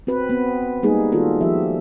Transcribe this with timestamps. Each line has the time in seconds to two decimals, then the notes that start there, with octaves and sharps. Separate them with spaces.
0.07 C4 F#4 B4
0.29 B3 C4
0.83 G3 G#3 A#3 C4 D#4 G#4
1.12 D#3 D4 F4 F#4 A4
1.41 F3 G4 E5